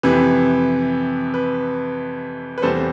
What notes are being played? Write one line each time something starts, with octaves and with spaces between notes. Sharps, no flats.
F2 C3 E3 B4
B4
B4
E2 C3 G3 A4 C5